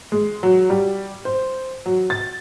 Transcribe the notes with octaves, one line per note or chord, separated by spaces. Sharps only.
G#3
F#3
G3
C5
F#3
A6